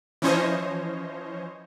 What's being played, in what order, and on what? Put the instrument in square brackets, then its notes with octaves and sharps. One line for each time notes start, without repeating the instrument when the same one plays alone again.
[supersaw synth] E3 F3 C#4 C5 C#5 D#5